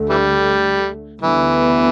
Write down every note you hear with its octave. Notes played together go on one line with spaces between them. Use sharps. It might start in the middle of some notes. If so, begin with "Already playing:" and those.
Already playing: D2 D3 A3
E3 G3
D2 D3 E3 G3 B3